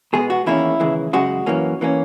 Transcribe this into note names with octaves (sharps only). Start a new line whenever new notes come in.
B2 G#3 B3 G#4
F#4
E2 D#3 A#3 C#4 E4
D#2 C#3 E3 G#3
F#2 C#3 G#3 F#4
F#2 E3 A#3 C#4
E3 A#3 C#4